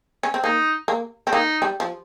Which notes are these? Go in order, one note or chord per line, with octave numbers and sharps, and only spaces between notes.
C#4
C4
A#3 D#4
A#3
C4
A#3 D#4
G3
F3